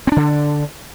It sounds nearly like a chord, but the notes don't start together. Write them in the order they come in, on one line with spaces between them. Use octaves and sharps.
C4 D4 D3